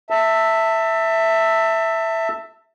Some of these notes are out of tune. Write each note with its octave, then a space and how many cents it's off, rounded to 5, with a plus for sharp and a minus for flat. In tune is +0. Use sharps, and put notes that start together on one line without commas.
E5 +0 A5 +30